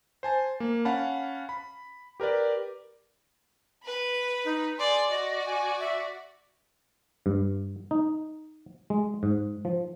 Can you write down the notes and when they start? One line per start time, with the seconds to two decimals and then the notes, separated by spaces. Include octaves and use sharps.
0.23 C5 G#5 A5
0.60 A#3
0.85 C#4 F5 F#5 A5 B5
1.49 B5
2.20 G4 A#4 B4 D5
3.84 B4 B5
4.45 D#4
4.78 G#4 D5 C6
5.10 F#4 D5 D#5
5.46 G#5
5.80 E5
7.26 G2
7.91 D#4
8.90 G#3
9.23 G#2
9.65 F3